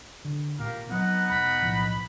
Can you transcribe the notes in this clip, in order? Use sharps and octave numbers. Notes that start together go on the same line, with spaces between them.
D3
G#1 A#2 G4 A#4 F5
F#3 B3 C4 D#4 F#5
E1 B5
B1 A2 F3